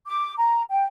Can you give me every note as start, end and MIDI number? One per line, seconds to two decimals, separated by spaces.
0.06 0.32 86
0.37 0.61 82
0.70 0.85 79